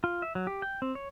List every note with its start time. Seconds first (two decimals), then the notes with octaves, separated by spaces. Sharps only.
0.04 F4
0.22 E5
0.35 F#3
0.47 G4
0.62 G5
0.82 C4
0.95 C#5